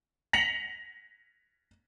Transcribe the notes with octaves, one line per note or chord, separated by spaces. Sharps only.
A#6 B6 C#7 F7 F#7